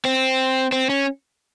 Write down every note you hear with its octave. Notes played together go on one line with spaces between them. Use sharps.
C4
C4
C#4